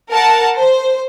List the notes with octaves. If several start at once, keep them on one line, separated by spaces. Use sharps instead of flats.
A#4 F#5 A5
C5